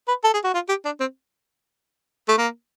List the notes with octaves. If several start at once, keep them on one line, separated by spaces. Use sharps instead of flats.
B4
A4
G#4
F#4
F4
G4
D4
C4
A3
A#3